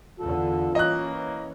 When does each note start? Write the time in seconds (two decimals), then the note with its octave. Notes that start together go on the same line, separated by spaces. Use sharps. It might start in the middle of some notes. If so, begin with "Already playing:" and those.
0.20 E2 D3 F4 A4
0.75 E3 A#3 C#4 D#5 F#6